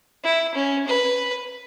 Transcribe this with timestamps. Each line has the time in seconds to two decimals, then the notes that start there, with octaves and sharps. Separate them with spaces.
0.24 E4
0.55 C#4
0.87 B4